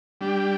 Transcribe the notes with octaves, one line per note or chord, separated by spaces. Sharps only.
G3 D4 G4